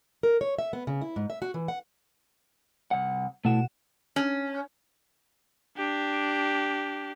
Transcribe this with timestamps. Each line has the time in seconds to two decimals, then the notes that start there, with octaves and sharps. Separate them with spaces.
0.23 A#4
0.41 C#5
0.58 E5
0.73 B3
0.87 C#3
1.01 E4
1.16 G#2
1.30 E5
1.42 F#4
1.54 E3
1.68 F#5
2.91 C2 F#5
3.45 B2 A3 E4 F#5 E7
4.16 C#4
5.77 D4 G4